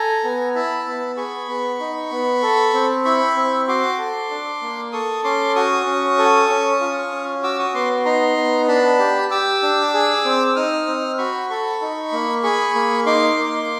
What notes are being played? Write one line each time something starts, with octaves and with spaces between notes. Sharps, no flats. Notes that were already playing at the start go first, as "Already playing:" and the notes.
Already playing: A4 G#5 A#5
B3
E4 A5 B5
B3
G#4 B5 C#6
B3
D#4
B3
A4
C4
E4 B5 C#6
C4
F#4 C6 D6
A4
D4
A#3
A4 C#6 D#6
C#4 C6 D6
F#4 C#6 D#6
C#4
A4
C#4
F4
C#4
F#4 D6 E6
C#6 D#6
B3 C6 D6
D#4 A#5 C6
B3
D4 A5 B5
G4
G4 D6 E6
D4
G#4
C4
D#4 D#6 F6
C4
F#4 B5 C#6
A4 B5 C#6
D#4
A#3
G#4 B5 C#6
A#3
D#4 C6 D6
A#3